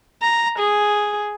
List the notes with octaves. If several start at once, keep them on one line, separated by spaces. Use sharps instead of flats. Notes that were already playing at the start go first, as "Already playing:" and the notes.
A#5
G#4